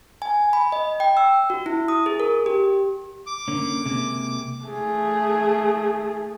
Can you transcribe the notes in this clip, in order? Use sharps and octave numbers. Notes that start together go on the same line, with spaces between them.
G#5
B5
D#5
G5
E6
F#4
E4
D#6
G#4
A#4
G4
D6
D3 A#3 C#4
C3 G#3 A#3
A3 G#4